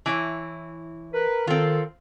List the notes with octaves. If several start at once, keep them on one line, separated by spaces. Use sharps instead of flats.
E3 E4 C#5
A#4 B4
D#3 C4 F4 A4